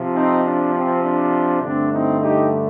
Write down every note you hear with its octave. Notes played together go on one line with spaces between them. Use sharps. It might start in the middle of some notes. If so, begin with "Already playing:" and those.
Already playing: C3 F3
C4 D#4
D4
C4
D4
G2 D3 A3 C4 D4
C4 D#4
D#4 G4